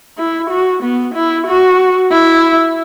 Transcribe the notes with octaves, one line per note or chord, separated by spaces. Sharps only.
E4
F#4
B3
E4
F#4
E4